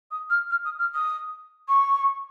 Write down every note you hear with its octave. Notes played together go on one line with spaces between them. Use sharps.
D#6
F6
F6
D#6
F6
D#6
C#6